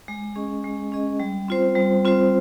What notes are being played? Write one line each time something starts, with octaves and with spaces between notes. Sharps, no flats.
G#3
C#4 G#4 D#5
G#3
C#4 G#4 D#5
G3
C4 F4 C5
G3
C4 F4 C5